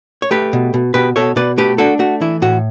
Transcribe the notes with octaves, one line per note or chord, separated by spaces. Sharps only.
C#5
A3 G4 B4
B2
B2
B2 G4 B4
B2 A4 C#5
B2 B4 D5
A3 G4 B4
D4 F#4 A4
A3 F#4
E3 E4
A2 F#4